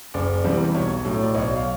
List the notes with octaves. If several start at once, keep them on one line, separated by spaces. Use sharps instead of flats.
F#1 D5
E2 C3 E3 G3
B1 C#5
A2 F#3
D5
B1 C#5 D#5
F5